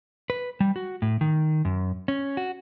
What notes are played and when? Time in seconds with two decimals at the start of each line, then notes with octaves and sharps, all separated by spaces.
0.30 B4
0.60 G3
0.76 F#4
1.02 A2
1.21 D#3
1.65 F#2
2.08 C#4
2.37 F#4